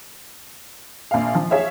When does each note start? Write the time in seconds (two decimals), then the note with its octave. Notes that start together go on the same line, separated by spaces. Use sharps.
1.11 A#1 F5
1.35 F3
1.50 G#4 C#5 E5 F5